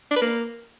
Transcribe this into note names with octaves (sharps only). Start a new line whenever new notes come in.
D4
B4
A#3